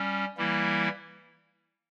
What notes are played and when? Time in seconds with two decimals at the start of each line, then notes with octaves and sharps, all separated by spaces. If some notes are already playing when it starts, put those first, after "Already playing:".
Already playing: G3 C#4
0.37 E3 G3 A#3 E4